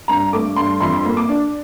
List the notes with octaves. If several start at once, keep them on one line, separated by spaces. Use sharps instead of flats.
G2 A#5
A3 D6
G2 C6
F2 C6
A#3
D6
D4